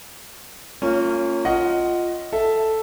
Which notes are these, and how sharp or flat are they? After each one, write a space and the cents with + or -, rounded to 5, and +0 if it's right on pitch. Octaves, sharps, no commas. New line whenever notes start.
A#3 -30 C#4 +0 F4 +0
F4 +0 D#5 +5 F#5 +15
A4 +0 E5 +0